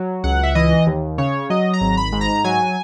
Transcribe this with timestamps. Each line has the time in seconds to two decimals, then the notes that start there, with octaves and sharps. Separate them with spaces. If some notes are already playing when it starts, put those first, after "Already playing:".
Already playing: F#3
0.24 C#2 F#5
0.43 E5
0.55 E3 D#5
0.87 D#2
1.18 C#3 C#5
1.50 F#3 D#5
1.73 A#5
1.81 G#1
1.97 B5
2.12 G#2
2.21 A#5
2.44 F#3 G#5